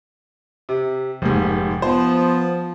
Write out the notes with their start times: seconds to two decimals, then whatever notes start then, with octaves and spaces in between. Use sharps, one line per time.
0.69 C3
1.22 F1 G#2 A#3 G4
1.82 F3 B3 C5